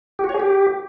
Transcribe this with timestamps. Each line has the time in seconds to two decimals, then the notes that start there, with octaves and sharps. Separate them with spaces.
0.19 G4
0.24 F#4
0.29 C#5
0.34 G#4
0.39 G4